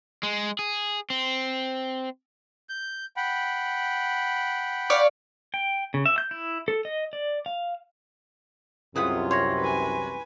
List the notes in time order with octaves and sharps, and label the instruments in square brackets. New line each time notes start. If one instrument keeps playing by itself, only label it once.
[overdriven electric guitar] G#3
G#4
C4
[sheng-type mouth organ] G6
F#5 G5 B5
[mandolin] C#5 D5 F5
[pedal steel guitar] G5
C#3
E5
G6
E4
A4
D#5
D5
F5
[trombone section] C2 F#2 C3 [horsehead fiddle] F4 [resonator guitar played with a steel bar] G#4 B4 F#5
[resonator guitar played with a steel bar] C#5 [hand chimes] C6 C#6 A#6
[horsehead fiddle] B4 G#5